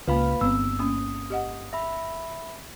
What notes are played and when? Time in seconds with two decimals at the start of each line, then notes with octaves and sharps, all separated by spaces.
0.08 C#2 A#3 F4 B4 F5 B5
0.41 G1 B3 C4 E6
0.79 A#3 C#4 D#6
1.30 G4 D#5 F#5
1.73 E5 B5